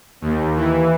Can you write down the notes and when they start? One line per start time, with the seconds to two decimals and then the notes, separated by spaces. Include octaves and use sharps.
0.21 D#2
0.56 E3